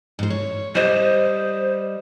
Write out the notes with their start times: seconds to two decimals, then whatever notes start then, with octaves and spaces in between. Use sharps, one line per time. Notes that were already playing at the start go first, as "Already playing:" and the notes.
0.19 G#2 C5
0.30 C#5
0.75 G3 C5 D#5